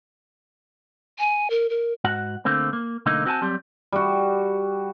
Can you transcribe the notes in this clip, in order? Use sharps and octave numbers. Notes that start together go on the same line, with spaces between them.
G#5
A#4
A#4
G#2 F#4 F#5
D3 A3 A#3 C4
A#3
B1 D3 A3 A#3 D#4
C4 F#4 G#4 G#5 A5
F#3 G3 C4 G4
G3 F#4